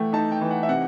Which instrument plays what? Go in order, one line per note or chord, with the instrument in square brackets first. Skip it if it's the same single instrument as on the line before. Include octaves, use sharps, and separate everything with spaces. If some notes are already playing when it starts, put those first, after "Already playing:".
Already playing: [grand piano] E3 A3 F#5 G5
D#4 A5
G5
E3
F#5
E5
C3 F#5